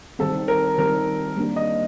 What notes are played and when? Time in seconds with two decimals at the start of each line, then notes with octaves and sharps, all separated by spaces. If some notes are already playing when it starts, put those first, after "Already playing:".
0.19 D#3 G3 C4 A4
0.48 A#4
0.78 D#3 G3 C4 A#4
1.37 G3 A#3 D4 G4 A#4
1.56 D#5